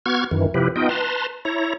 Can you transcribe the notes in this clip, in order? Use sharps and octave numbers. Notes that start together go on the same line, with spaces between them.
B3 F#4 C#6 F6 G#6
F#2 D#3 E3
C3 F3 E4 G4 B4
B3 D#4 F4 D#5 G5
B4 A5 A#5 C6
E4 C#5 A#5